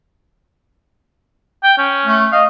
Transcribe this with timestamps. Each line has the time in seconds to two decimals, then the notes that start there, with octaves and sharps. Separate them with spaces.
1.64 G5
1.78 C#4
2.05 A3
2.33 D#5 F5